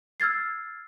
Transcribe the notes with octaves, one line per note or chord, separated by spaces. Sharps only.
E6 F6 G#6 A6 C7